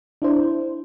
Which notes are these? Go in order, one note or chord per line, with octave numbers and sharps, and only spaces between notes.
D4 E4 C5